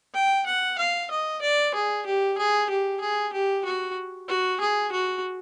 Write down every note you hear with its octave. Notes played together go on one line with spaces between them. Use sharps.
G5
F#5
F5
D#5
D5
G#4
G4
G#4
G4
G#4
G4
F#4
F#4
G#4
F#4